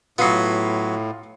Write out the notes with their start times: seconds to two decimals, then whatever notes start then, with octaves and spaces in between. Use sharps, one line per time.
0.18 A2 F#3 B3 F4 D#6 C7